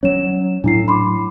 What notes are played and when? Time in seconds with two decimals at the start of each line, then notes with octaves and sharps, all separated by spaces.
0.03 F#3 C#4 C#5 E7
0.64 A2 F#3 D4 E4 C7
0.88 B5 C6 D6